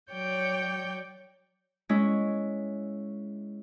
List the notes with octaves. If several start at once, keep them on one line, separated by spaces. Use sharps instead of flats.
F#3 C#5 D5 G5 G6
G#3 C#4 E4